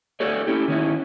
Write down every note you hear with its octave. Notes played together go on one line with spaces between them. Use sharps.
F#4 G#4 A4 C#5 D5
C#4 E4 G4
D#3 C#4 E4